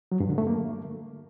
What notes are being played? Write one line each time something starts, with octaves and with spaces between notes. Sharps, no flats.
F#3
G2
D3
A3
A#3